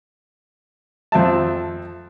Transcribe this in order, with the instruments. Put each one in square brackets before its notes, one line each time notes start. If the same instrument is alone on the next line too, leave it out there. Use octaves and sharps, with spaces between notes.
[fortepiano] F2 C4 E5 A5